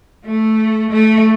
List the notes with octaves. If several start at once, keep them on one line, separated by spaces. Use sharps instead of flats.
A3
A3